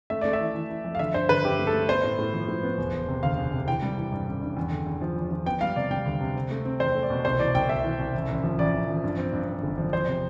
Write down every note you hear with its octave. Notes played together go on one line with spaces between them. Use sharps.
A3 E5
A3 D5
E5
E3
E3
E3
F2
F5
D3 E5
G2 C5
D3 B4
G2 G4
A3
A4
A3
B3 C5
A2
A2
F3
A2
B3
E1
E1
C3
D2 F5
E1
C3
E3 G5
G3
E3
G2
A1
G2
E2
D3
E2
F3
E2
F3
B3 G5
G3 F5
C3 D5
G3 G5
D2
C3
C4
A3
C4
E2 C5
A3
D5
B2
C2 C5
E3 D5
C2 G5
C2 E5
E3
C2
A1
A1
F3
A1 D5
A1
F3
G2
C4
G2
C4
G1
F3
E2 C5
C3